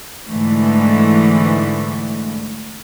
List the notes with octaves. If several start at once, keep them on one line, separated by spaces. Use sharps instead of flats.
G#2 D3 E3 A3